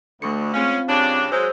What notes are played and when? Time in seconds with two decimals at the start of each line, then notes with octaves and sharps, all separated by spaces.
0.22 D2 A3 C#6 C#7
0.54 G#3 C4 C#4 F4 F5
0.89 G2 C#3 D4
1.32 F#3 G#3 C5 E6 G6